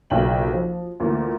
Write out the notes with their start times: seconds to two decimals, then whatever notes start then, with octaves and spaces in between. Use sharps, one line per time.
0.10 F#1 B1 A#2 G5 F#7
0.53 F3
1.00 D2 A#2 E3